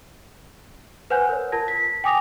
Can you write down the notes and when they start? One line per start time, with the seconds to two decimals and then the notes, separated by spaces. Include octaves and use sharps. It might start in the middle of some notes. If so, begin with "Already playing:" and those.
1.10 B4 C5 F#5 G#5 F#6 G6
1.29 A#4 C#5
1.52 F4 A#4 A5 G#6 A#6
1.68 B6
2.04 G5 G#5 D6 D#6 A#6 F7